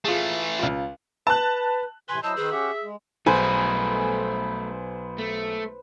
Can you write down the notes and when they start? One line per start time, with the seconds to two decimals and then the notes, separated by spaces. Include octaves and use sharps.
0.05 E3 A3 F4 G#4
0.59 C#2 F4
1.27 B4 A5 F#6
2.09 A2 C3 E3 B4 G#5 C6
2.23 F#3 E4 C5 D#5 A5 E6
2.36 D#3 G#4 B4
2.51 C#4 G4 E5 F#5
2.83 G#3
3.26 B1 A3 G#4 B4 C5 G#5
5.19 A3